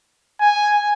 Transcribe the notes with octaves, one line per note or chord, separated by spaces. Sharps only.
G#5